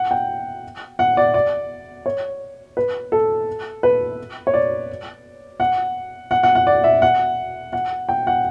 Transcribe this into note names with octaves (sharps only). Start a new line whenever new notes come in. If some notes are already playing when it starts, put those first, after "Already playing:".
Already playing: F#5
G5
F#5
D5
D5
C#5
B4
A4
B4
C#5
D5
F#5
F#5
F#5
F#5
D5
E5
F#5
F#5
G5
F#5